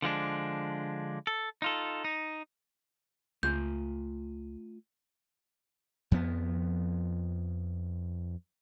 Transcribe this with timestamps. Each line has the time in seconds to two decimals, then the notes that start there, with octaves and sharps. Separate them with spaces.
0.02 D3 F3 G#3 D4
1.27 A4
1.62 D#4 F4 A4
2.04 D#4
3.43 C#2 A3 F4 G#5 G6
6.11 F2 F3 B3